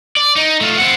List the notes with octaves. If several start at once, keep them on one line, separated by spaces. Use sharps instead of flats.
D5
D#4
A3 F4
C4 F#5